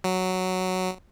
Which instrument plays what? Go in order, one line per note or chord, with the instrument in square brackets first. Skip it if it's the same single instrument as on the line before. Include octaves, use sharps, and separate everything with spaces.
[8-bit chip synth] F#3